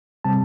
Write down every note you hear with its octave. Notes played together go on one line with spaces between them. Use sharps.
C3 G3 C4 A5